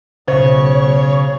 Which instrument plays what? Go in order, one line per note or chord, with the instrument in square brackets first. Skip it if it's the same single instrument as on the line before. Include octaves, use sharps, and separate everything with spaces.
[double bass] B1 [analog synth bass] C#3 [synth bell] C5 [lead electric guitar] C#5